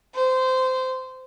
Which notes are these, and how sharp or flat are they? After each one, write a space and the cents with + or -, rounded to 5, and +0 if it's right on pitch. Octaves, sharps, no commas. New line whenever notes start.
C5 -20